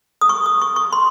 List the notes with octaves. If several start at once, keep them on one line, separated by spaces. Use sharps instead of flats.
D#6
C#6
D#6
C#6
C#6
C6